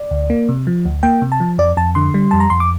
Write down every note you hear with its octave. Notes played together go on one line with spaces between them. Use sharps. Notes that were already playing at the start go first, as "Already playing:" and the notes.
Already playing: D5
D2
A#3
C3
F3
D2
A#3 G5
C3
A5
F3
F2 D5
F2 A5
D3 C6
G3
F2 A5
A#5
F2 C6
D6